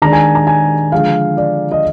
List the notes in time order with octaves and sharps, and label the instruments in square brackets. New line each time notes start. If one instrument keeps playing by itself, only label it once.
[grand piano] D#3 G#3 D4 A#5
G#5
A#5
G#5
D3 F3 G#3 D4 F5
D5
D#5